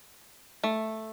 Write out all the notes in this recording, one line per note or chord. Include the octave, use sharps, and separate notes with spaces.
A3